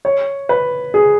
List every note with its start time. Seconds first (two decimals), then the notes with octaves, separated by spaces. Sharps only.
0.05 C#5
0.49 B4
0.94 G#4